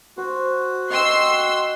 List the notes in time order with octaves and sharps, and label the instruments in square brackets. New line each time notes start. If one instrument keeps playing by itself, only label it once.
[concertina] F#4 [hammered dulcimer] C5
[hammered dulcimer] D#5 G5 [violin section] C6 E6